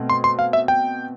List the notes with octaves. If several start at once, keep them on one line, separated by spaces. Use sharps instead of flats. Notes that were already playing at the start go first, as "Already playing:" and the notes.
Already playing: B2 A3 C4
C6
C6
F5
E5
G5